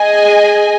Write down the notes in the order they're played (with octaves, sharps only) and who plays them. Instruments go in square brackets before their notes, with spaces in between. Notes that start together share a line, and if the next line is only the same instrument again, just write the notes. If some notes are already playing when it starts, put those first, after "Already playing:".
Already playing: [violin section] G#4 D#5 G#5